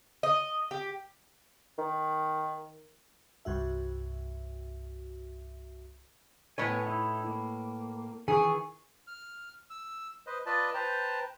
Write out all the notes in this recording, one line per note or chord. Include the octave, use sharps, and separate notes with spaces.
D#5
G4
D#3
C2 G2 F#4 E5
A2 B3 B4 C#5 G#5
D#4 E4
A#3
D#3 E3 G#4 C#6
F6
E6
B4 C5 D#5
F4 B4 D5 D#5 A5
B4 C5 G5 A5 A#5